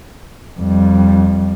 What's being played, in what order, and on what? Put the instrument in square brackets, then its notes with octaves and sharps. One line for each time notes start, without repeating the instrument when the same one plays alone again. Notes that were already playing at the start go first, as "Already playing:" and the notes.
[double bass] F2 G3